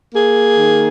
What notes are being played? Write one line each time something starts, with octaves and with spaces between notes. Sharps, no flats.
A#3 G#4
D#3